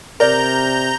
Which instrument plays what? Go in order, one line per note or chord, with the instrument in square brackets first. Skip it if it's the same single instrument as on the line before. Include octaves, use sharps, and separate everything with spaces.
[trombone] C3 [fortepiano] A#4 D5 [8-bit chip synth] A#5 G6